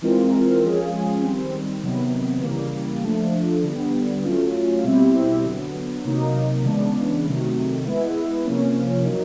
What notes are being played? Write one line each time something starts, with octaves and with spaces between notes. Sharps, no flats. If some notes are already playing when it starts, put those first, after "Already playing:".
E3 G#3 C4 F4 A#4
F3 G#3 C#4 F4 G#4
D#3 G3 C4
C3 D#3 F#3 B3
C#3 E3 G3 A#3
F3 A3 D4
D3 G3 B3
F#3 A3 C#4 F4
B2 G3 C4 E4 G4
D3 F#3 B3
C3 D#3 F#3 A#3 D#4
C#3 E3 G#3 B3 D4
C3 D#3 F#3 A3
G#3 B3 E4
C3 F3 A#3 C#4
F#3 A#3 D#4